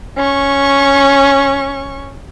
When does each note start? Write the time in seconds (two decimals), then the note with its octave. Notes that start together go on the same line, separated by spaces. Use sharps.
0.17 C#4 C#6